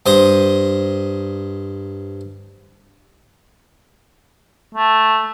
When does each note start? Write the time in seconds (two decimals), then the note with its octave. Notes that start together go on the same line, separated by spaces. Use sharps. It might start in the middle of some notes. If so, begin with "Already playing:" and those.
0.06 G2 C5 A#5 D#6
4.75 A3